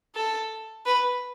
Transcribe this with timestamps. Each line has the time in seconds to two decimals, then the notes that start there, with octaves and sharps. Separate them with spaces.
0.15 A4
0.86 B4